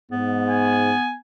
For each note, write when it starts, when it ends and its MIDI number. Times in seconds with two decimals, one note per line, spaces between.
0.11 0.93 44
0.11 1.16 59
0.50 1.18 80